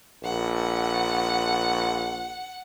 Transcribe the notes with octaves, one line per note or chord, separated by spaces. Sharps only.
A#1 F#5